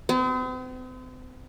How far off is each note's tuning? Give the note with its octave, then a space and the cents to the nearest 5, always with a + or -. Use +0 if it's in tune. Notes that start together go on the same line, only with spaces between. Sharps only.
C4 -45